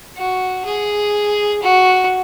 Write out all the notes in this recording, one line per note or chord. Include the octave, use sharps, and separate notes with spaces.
F#4
G#4
F#4